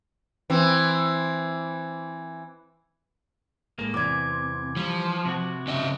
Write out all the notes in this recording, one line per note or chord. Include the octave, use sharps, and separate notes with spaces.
E3 C4
A2 G#3 A#3
E2 C3 E3 D5 D6 G#6
F3 G3
C3 F#4
C#3 D#5 E5